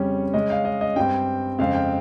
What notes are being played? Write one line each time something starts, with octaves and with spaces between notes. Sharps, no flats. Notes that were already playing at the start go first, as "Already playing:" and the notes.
Already playing: F2 C#3 G3 C#4 C#5
C#3 G#3 C#4 D#5
F5
D#5
D#5
G2 G3 C4 G5
F2 C#3 G#3 C4 F5
G5